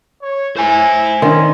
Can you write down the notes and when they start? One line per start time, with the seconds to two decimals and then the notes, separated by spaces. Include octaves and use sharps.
0.22 C#5
0.57 E4 C5 G#5
1.22 D#3 C#4 D4 C6